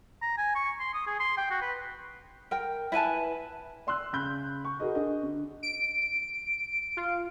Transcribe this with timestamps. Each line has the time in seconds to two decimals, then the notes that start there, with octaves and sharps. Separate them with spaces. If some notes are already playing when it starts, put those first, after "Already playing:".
0.22 A#5
0.37 G#5
0.55 C#6
0.80 C6
0.94 D#6
1.07 G#4
1.20 C6
1.37 G5
1.50 F#4
1.62 B4
2.51 A#4 G5
2.92 E4 B4 G#5 A5
3.87 D5 C6 E6 F#6
4.13 C#3 B5 G6
4.65 C#6
4.80 F#4 G#4 A#4 D#5
4.95 D4 G#4 D#5
5.23 D3
5.63 D7
6.97 F4